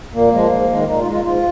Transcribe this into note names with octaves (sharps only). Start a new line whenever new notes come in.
A#2 A#3
F3 G#3
G#2
D#3 G#3
A#2 D#4
F4
G#3
F4
G#2 F4